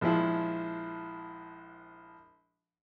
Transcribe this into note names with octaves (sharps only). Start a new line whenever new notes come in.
A#1 F3 G#3 E4